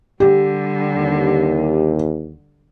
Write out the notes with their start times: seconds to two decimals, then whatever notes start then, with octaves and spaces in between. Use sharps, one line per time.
0.20 D3 G3 G4
0.97 D#2